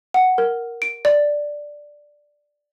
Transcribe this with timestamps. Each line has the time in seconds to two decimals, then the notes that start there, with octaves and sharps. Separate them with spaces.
0.14 F#5
0.38 A#4
0.82 D7
1.05 D5